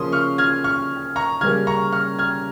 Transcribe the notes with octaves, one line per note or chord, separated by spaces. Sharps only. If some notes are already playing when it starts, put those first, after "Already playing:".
Already playing: C#3 F3 A#3 C#4 C6 D#6
C#6 F6
F6 G#6
C#6 F6
A#5 C#6
C#3 G3 A#3 C#4 F6 G#6
A#5 C#6
C#6 F6
F6 G#6